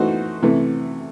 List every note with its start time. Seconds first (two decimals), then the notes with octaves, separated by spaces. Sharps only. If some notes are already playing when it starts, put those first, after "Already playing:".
Already playing: E3 A3 D#4 F#4 C5
0.42 C3 E3 A3